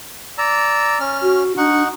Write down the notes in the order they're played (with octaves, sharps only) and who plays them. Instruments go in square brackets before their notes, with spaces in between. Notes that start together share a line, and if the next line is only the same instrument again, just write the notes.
[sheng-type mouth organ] D5 A#5 E6
C#4 F6
[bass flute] F#4
[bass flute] D4 [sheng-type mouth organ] D#4 F#5 C#6